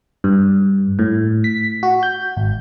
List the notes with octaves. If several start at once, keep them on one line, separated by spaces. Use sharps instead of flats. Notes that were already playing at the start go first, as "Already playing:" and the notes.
G2
A2
B6
F#4
G6
G#1